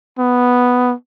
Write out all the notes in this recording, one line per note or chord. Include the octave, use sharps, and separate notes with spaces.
B3